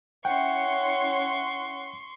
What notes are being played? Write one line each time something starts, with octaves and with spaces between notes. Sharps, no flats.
C#4 E4 F#5 G5 C6 C#6